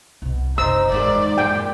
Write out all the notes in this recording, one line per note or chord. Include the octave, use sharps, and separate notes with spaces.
C2 B2
F#1 C4 D#4 E6
E2 G#2 D#3 G#3 D5
F#2 A#2 G#3 G5